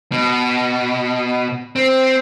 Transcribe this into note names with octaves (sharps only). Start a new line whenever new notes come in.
B2
C4